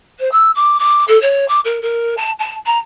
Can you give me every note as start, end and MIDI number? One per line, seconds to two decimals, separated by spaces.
0.19 0.29 72
0.31 0.50 88
0.54 0.79 86
0.79 1.04 86
1.07 1.19 69
1.21 1.47 73
1.48 1.59 86
1.64 1.78 70
1.81 2.13 70
2.17 2.31 81
2.39 2.55 81
2.65 2.77 82